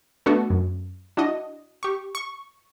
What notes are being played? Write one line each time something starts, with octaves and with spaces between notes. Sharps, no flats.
A3 B3 D4 F#4 A4
F#2
D4 E4 F#4 D#5
G4 C#6
C#6